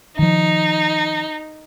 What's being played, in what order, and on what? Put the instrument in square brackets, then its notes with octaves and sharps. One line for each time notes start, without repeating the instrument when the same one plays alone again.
[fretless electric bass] D#3 F3 [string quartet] D#4